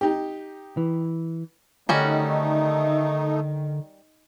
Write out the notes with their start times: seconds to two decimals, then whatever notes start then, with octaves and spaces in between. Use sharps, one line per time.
0.01 D#4 G4
0.77 E3
1.89 D3 D#3 G3 A3 C#4 D#4 F#4